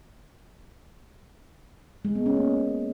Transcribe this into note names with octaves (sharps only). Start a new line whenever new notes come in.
G#3
B3
C#4
A#3